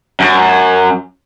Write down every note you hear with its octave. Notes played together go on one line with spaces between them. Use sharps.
F#2